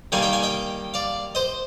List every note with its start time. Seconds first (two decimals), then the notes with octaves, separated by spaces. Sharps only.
0.12 D#3 G3 A#3 F5 G#5
0.23 D#5 G5
0.33 F5 G#5
0.43 D#5 G5
0.94 D5 F5
1.35 C5 D#5